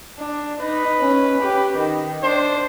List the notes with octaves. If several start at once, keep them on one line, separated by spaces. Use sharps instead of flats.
D4
D#4 B4
C#4
G4
D#3
D4 C5